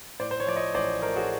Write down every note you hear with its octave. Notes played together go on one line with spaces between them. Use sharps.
A2 C5 D5
C5
C#5
F3 D5
C#5 D#5
A1 C5 D5
A3 A#4 C5
F#4 G#4